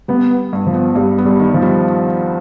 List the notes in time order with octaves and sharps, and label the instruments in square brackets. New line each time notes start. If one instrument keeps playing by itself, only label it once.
[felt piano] G3 [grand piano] B3
[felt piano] B3
G2
[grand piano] F3
[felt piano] B3
[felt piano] G2 [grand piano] G3
[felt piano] B3
[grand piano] G3
[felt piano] D#3
[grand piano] F3
[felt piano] G3